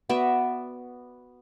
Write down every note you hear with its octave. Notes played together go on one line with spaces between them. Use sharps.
B3 F#4 D5 E5